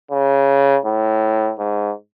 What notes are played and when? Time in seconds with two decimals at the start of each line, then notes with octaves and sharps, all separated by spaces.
0.11 C#3
0.85 A2
1.59 G#2